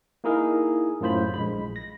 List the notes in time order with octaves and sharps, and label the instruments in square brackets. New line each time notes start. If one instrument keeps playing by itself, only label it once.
[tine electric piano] A#3 D#4 E4 G#4 A#4
F#2 A2 F4 C5 B5
A#1 G#3 B5
A#6